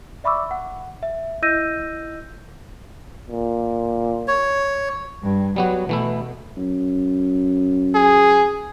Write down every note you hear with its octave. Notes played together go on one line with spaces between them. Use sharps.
D5 E5 B5 C#6 D6 E6
F#5
E5
E4 D#5 E6 G6 A#6 D#7
A#2
C#5
G2
F#3 G3 B3 F#4
B2 E3 A3 E4
F#2
G#4